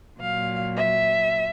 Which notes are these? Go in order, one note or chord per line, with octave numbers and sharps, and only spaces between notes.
A#2 F#3 F5
E5